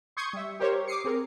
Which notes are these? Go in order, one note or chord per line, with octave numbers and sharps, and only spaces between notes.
C6 C#6 D#6 G6 G#6 C#7
G3 E5
G4 A#4 C5 C#5
D6 D#6 C7 C#7
C4 G#4 A#4